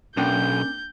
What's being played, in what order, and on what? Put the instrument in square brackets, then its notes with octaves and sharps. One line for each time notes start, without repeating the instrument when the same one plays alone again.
[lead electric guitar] B1 [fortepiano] A#3 D4 G5 [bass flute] C#4 [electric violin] G6